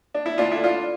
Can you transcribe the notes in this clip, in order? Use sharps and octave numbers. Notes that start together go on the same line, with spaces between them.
D4
E4
D2 D4 F4
D3 E4
D4 F4